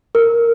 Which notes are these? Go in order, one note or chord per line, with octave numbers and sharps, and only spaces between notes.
A#4